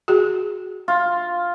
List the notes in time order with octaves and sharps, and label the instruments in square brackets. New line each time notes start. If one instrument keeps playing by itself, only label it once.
[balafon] F#4 G#4
[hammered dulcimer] F4